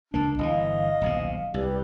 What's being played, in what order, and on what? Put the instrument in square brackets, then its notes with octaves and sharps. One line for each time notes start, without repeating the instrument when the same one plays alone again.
[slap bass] C#2 A#3 [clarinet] D4
[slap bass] G1 D#3 E3 [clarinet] D#5 [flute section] F5
[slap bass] D#1 B1 C3
[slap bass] C2 [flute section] G4 B4 D5